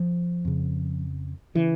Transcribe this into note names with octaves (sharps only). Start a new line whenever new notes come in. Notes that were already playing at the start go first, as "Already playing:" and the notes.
Already playing: F3
F2 C#3
C#3 E3